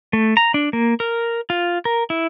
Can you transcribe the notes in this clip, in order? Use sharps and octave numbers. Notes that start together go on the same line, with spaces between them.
A3
A#5
D4
A#3
A#4
F4
A#4
E4